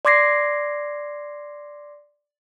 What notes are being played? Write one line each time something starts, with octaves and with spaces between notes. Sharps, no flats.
D5 C6 D6 G#6 A#6 C7